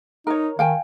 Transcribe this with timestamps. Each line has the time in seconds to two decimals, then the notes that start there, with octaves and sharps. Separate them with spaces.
0.27 D#4 A#4 C#5
0.59 D#3 F5 G5 G#5